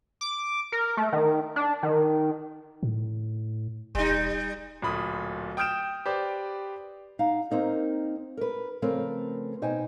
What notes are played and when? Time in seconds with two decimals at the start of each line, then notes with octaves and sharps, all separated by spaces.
0.21 D6
0.72 A#4
0.97 A3
1.12 D#3
1.56 D4
1.83 D#3
2.83 A2
3.95 E1 G3 D#4
4.82 D1 A#2 B5 D#6
5.57 G5 D#6 F6 G6 D7 E7
6.06 G4 B4 C5 D5
7.19 D#4 F5 F#5
7.51 A#3 C4 D#4 A#4
8.37 A#4 B4
8.82 C#3 F3 A3 C4 A#4 B4
9.62 B2 D#4 C5 G5 G#5